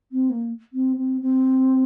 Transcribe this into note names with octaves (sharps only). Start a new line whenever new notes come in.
C4
A#3
C4
C4
C4